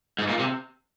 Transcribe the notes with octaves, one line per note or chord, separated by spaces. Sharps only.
G#2
A#2
C3